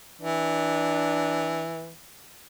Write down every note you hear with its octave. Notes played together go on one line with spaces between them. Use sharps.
E3 D4